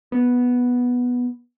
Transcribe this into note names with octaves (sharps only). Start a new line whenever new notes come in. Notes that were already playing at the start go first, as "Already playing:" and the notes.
B3